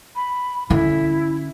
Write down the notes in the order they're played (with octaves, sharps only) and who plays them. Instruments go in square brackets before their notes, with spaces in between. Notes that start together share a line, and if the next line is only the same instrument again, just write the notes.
[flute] B5
[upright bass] D3 C#4 [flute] E4